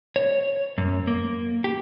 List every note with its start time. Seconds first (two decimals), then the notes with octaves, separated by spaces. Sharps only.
0.16 C#5
0.78 F#2
1.07 A#3
1.64 G4